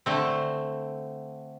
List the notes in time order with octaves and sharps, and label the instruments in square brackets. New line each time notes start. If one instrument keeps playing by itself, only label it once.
[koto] D3 A3 C4